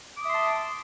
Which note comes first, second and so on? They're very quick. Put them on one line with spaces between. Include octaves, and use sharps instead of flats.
D6 D#6 E5 C6 A5